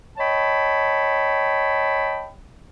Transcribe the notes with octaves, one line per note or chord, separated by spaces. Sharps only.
C#5 D#5 G5 A5 B5